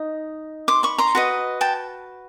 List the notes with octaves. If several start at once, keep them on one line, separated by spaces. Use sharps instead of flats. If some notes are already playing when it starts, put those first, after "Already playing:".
Already playing: D#4 D#5
C6 D6
B5 C#6
A#5 C6
F#4 B4 D#5
G5 A5